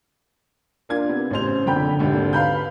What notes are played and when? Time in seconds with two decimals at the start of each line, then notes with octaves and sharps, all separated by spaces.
0.89 A#3 D4 F4 G#6
1.09 C3 B3
1.31 A1 C#3 C5 F7
1.66 F#1 F2 D3 G5 B5 G6
1.99 G#1 D#2 D3
2.33 B4 F5 B5 G6